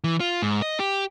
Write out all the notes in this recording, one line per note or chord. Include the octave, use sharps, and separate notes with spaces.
E3
F4
G#2
D#5
G4